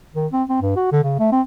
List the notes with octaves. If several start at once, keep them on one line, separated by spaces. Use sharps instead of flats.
D#3
C4
C4
G2
F#4
D3
C#3
A3
C4